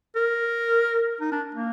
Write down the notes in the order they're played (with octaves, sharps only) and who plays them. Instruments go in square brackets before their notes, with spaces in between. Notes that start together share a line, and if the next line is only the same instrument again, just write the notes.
[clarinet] A#4
D#4
D4
A#3